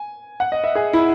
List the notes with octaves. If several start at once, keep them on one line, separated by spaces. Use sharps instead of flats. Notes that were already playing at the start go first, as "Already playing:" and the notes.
Already playing: G#5
F#5
D#5
E5
G#4
E4